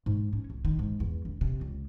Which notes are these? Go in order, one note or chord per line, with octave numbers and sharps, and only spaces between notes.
G#2
C#4
C2
D#3
G#2
E2
D3
C3
C#2